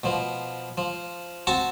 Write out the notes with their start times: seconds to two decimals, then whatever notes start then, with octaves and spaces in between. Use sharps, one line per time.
0.03 B2 F3
0.77 F3
1.47 C4 F#4 A5 C#6